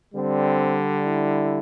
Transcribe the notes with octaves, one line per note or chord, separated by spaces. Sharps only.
D3 G3 C4
E4